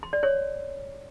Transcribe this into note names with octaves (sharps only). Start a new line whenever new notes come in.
C6
D5
C#5